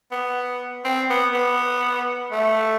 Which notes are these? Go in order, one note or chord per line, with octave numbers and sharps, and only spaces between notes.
B3
C4
B3
B3
A3